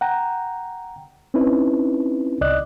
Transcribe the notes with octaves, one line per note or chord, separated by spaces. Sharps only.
F#5 G5 A#5
C4 C#4 D#4 E4 B4
C2 D5 D#5 F#6